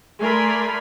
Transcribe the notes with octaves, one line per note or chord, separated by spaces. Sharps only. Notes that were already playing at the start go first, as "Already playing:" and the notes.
A3 A#4 D5 G#5 B5 C6